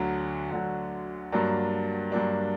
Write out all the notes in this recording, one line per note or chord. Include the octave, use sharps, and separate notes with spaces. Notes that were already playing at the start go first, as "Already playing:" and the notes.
Already playing: D2 D3 F#3
D2 D3 F#3
G2 F#3 A#3 D4
G2 F#3 A#3 D4